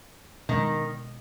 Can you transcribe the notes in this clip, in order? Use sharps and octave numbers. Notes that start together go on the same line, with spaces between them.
B2 D#3 G#3 C#4